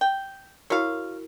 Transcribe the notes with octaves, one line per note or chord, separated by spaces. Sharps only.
G5
E4 F#4 A#4 C#5 F5